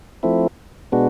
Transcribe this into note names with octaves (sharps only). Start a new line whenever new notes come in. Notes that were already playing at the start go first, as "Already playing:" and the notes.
F3 A3 C4 E4
B2 G#3 B3 D4 F#4